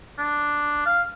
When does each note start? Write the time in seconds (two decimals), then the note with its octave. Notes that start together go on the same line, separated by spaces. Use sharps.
0.19 D4
0.86 F5